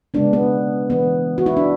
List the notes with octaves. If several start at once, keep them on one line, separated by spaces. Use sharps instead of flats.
C#3 G#3 B3 D4
B3
E3 B3
F#4
E4
D4